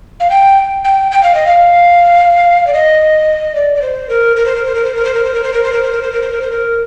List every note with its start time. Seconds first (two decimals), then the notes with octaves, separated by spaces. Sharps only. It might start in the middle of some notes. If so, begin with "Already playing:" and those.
0.20 F5
0.30 G5
0.85 G5
1.11 G5
1.23 F5
1.35 D#5
1.46 F5
2.67 D5
2.74 D#5
3.55 D5
3.75 D5
3.82 C5
4.09 A#4
4.36 A#4
4.46 C5
4.56 A#4
4.66 C5
4.75 A#4
4.85 C5
4.95 A#4
5.05 C5
5.14 A#4
5.24 C5
5.34 A#4
5.44 C5
5.54 A#4
5.63 C5
5.73 A#4
5.83 C5
5.93 A#4
6.02 C5
6.13 A#4
6.22 C5
6.32 A#4
6.42 C5
6.51 A#4